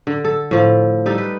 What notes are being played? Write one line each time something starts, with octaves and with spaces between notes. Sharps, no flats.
D3
A4
A2 F3
G3 D#4 A4
B4